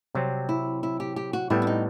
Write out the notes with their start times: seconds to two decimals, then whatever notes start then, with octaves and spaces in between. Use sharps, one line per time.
0.15 C3 F#3 G3 C4
0.49 E4
0.83 E4
1.00 G4
1.16 G4
1.33 F#4
1.50 A2 G3 B3 E4
1.62 C4
1.67 D#4